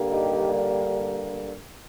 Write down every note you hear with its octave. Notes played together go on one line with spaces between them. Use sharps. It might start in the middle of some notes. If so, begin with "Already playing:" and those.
Already playing: G2 D3 G3 A#3
D#4 G4